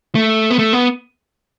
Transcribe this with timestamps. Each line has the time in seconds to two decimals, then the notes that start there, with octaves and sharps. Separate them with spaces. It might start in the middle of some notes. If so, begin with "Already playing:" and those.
0.15 A3
0.50 B3
0.59 A3
0.73 B3